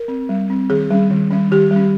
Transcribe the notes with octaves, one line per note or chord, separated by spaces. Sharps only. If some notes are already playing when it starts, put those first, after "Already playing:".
Already playing: A#4
C4
G3
C4
D#3 G#4
G3 C#4
D#3
G3 C#4
D#3 G4
G3 C#4